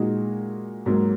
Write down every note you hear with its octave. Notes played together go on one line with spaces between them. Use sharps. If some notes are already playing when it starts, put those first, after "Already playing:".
Already playing: A#2 G#3 D#4 F#4
G#2 F#3 A#3